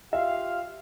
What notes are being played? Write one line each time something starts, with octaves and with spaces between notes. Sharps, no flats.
F4 G4 E5 F5